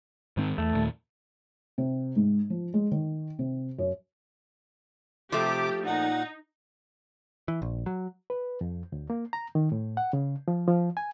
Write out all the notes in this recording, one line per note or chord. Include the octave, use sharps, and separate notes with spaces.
G#2 D#3 C4
E2 A3
D#2 A#2
C3
G#2
F3
G#3
D#3
C3
F#2
C3 F3 A3 G4 D6
A#2 D#4 F#5
E3
A#1
F#3
B4
F2
D2
A#3
A#5
D#3
A2
F#5
C#3
F3
F3
G#5